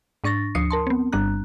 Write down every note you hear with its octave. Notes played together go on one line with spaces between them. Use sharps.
G#2 D4 C#6 A6 A#6
D2 F3 D4 D#6 C7 C#7
A#4 A5 C6
B3 C4
G1 G2 G3 D4 A#5 F#6